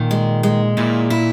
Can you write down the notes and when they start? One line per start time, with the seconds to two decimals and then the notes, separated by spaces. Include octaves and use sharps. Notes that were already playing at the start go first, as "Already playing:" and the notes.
Already playing: A#2 D#3
0.11 G#3
0.43 G#3
0.77 A#2 E4
1.10 E4